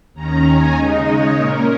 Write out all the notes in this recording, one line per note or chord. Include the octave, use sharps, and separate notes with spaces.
D#2 D#3 C#4 A#5
G#5
C#3 G#3 D#4 D#5
C#5
A#2 A#3 C#4 A#4